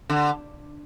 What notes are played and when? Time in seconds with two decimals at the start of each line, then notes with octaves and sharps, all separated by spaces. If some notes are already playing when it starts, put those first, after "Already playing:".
0.10 D3